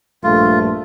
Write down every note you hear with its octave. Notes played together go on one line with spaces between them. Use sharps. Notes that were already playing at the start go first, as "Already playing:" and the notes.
A#1 G2 A3 F4